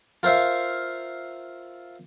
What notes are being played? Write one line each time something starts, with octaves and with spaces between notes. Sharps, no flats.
F4 A#4 C5 E5 F5